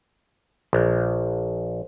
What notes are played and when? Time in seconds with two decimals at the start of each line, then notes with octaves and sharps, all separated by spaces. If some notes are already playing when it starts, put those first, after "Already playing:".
0.73 A#1